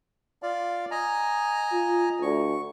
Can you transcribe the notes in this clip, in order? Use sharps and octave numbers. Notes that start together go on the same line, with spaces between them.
F4 D5 F5
D#5 G#5 A#5
F4
D2 C#6